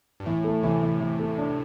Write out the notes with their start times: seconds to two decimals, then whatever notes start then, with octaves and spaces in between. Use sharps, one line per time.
0.20 G2
0.26 A2 E3
0.44 A3
0.63 C3 E3
0.82 E3
1.00 E3
1.19 A3
1.38 D4